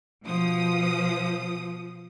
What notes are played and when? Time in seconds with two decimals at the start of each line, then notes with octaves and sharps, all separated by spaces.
0.24 B2 F3 D#6